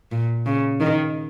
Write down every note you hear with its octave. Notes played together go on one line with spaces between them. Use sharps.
A#2
C#3
D#3